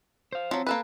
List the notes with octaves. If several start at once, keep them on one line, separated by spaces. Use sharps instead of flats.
C5 F5
F3 F#3 C4
A#3 A4 B4